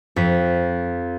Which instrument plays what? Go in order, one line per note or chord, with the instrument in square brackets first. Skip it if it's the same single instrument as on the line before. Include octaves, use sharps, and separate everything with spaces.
[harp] F2 B6